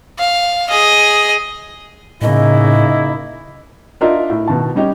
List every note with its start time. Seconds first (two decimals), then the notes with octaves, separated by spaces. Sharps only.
0.19 F5
0.70 G#4 D#5
2.22 A2 C#3 A#3 D#4 E4 D#5
4.01 D4 D#4 F4 A#4 D#5 E5
4.30 A2
4.48 B2 D#3 A5
4.75 G3 C#4 D#4 G4